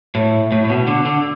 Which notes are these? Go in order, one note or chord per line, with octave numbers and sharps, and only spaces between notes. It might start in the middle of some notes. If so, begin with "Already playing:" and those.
A2
A2
A2
B2
D3
D3